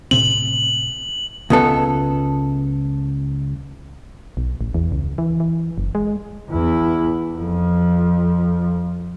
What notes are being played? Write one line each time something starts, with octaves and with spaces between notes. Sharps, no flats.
A2 C3 C4 F#7
C#2 B3 A4
B1
A1
E2
C#2
E3
E3
F#1
G#3
E2 E4
F2 F3